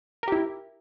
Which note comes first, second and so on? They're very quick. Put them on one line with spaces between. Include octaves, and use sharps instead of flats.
A#4 G4 E4